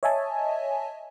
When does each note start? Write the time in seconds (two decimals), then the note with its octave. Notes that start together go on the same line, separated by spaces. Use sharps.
0.03 C#5 D#5 E5 G#5 A5